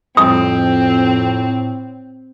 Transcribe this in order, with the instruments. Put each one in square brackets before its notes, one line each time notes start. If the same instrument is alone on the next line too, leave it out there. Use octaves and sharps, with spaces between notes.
[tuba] F2 [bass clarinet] A2 [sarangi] C4 [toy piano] D#6